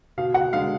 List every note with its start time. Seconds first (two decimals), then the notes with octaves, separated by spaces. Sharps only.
0.18 B2 F5
0.34 F#5
0.53 G#3 D4 F5